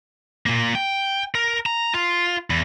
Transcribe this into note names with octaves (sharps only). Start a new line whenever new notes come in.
A#2 A#3
G5
A#4
A#5
F4
E2